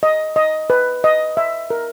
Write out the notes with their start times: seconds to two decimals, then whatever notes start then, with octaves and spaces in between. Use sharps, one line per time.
0.03 D#5
0.36 D#5
0.70 B4
1.04 D#5
1.37 E5
1.70 A#4